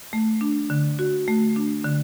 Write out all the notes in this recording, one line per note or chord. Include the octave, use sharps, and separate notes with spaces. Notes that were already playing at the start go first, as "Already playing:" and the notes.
A3
D4
D3
F#4
A3
D4
D3